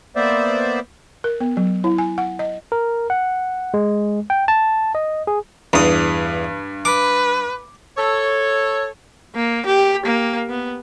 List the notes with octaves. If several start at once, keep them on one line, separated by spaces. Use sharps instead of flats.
A#3 B3 C5 D5 E5
A#4
B3
F#3
E4
G#5
F#5
D#5
A#4
F#5
G#3
G5
A5
D#5
G#4
E2 G2 D#6
B4 D6
A4 C#5
A#3
G4
A#3
B3